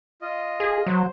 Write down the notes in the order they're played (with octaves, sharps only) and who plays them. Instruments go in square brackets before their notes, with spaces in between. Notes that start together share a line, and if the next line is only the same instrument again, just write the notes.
[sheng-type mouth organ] F4 D#5
[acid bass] G#4
[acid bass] F#3 [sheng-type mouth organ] C5